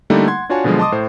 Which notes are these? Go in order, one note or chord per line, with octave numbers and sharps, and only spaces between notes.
D3 G3 A3 A#3 D#4 E4
F#5 C6 G#6
D4 F4 F#4 C#5 G#5 A5
B2 D3 F3 F#3 G#3
D#5 A5 C6 D6 D#6
A2 C5